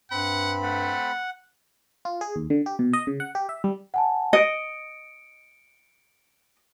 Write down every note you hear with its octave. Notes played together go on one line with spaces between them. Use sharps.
G2 C4 F#5 B5
A3 F#5
F4
G#4
D#2
D3
G4
B2
D#5
C#3
F#5
G4
E5
G3
F#5 G#5 A5
D#5 C#7 D7